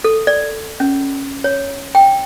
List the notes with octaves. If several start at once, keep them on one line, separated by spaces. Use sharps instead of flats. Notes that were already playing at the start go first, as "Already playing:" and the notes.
A4
D5
C#4
C#5
G5